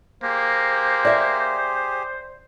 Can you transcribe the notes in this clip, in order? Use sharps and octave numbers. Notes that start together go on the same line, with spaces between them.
A#3 G4 G#4 C5
D5 E5